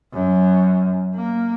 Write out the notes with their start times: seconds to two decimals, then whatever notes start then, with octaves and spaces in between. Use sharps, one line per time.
0.13 F#2
1.15 A#3